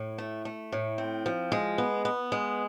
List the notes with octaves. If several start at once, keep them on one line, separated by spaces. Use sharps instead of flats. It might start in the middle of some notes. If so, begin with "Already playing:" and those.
Already playing: A2
A3
A3
A2
C4
F3
G#3
B3
B3
G#3